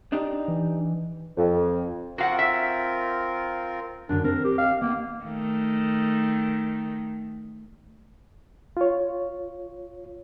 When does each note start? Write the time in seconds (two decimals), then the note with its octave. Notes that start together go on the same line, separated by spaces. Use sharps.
0.12 D4 D#4 G4
0.48 E3
1.37 F2
2.18 C4 F4 F#4 A#4 F5 F#5
2.39 E5
4.09 F#2 D3 D4
4.24 C4 A#4
4.44 G4
4.58 F5
4.81 A#3 B3
5.24 D#3 A3
8.77 F4 C#5